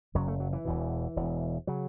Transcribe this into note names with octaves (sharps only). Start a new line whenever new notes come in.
F#1 F#2 C#3 F#3
A3
F#3
E3
E1 E2 B2
E1 E2 B2
C#3 F#3